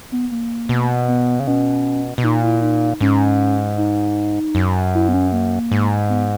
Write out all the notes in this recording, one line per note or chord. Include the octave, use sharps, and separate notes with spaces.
B3
A#3
B2
B3
C#3
B2 C#4
B2
A#2 D#4
E4
D#4
G#2 C#4
D#4
F#2
E4
B3
C#4
A#3
G#2
B3